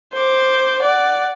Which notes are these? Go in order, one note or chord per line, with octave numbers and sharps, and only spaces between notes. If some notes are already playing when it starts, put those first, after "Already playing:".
C5 D6
D5 F#5